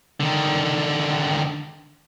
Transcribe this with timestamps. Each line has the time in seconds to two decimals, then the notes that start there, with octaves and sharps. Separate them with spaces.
0.20 D3 D#3